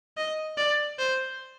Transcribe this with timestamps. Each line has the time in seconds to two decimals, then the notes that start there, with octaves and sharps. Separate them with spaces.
0.17 D#5
0.58 D5
0.99 C5